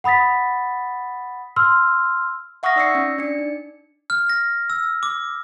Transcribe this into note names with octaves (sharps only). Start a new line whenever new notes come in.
F#5 B5 D#6 A6 B6
C6 E6 F6
E5 F#5 C#6 D#6 F6 A#6
D#4 D5 E6 A#6 C7 C#7
C#4
D4 D5 C#7
D#4
F6
A#6
E6
D6